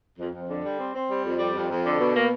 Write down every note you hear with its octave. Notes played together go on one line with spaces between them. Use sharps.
F2
F2
D3
G3
C4
C4
G3
F2
G3
F2
F2
D3
B2
A#3